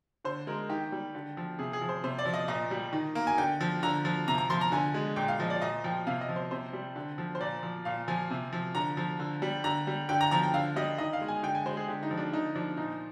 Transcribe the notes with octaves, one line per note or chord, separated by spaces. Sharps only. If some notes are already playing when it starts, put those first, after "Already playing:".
D3 C5
G#3 A#4
D#3 G4
G3
D3
F3
C3 G#4
G#4
F3
C5
C3 C5
D5
F3
D#5
A#2 D#5
G3
D#3
A#3
G#5
D3 G5
F3
D3 A#5
F3
C3 A#5
A#5
F3 C6
A#5
D3 G#5
G#3
A#2 G5
F5
F3 D#5
D5
A#2 D#5
F3 G5
C3 F5
D#5
F3
C5
C3 C5
G3
D3
F3
C5
A#2 D5
F3
A#2 F5
F3 G#5
C3
F3
D3 A#5
F3
D3
G3
D3 A#5
G3
D3 G5
A#5
F3 A#5
G5
D3 F5
G3 D#5
D#3 D#5
F5
G#3
G#5
D3 G5
G#5
G#3 C5
G#4
D3 G4
D#4
F3
D4
D3 D#4
F3 D4
A#2 D#4